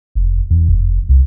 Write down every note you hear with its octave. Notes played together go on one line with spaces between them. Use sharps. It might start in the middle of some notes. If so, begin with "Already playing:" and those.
F1
E2
F1
C2